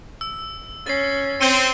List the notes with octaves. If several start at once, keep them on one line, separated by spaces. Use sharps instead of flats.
E6
C#4 A6 C7
C4 C#7 D#7 G7